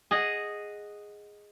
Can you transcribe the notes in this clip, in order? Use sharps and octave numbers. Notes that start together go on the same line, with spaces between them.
G#4 D#5 F#5